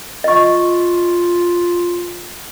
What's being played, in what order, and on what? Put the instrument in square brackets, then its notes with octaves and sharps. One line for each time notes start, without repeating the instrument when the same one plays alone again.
[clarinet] F4 [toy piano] D#5 C#6